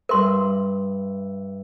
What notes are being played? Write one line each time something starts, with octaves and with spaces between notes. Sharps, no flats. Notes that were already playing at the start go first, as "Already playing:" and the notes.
G2 A#4 E5 C6